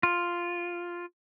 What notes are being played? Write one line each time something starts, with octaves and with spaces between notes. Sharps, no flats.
F4